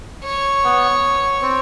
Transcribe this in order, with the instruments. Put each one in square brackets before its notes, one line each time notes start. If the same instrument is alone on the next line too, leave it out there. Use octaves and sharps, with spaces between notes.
[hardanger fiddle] C#5
[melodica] B3
C4